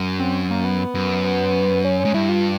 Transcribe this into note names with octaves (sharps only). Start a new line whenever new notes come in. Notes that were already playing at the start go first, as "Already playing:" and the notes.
Already playing: F#2
C4
A#3
B3
F#2
B3
C#4
C#4
G#2
G2 E4
F4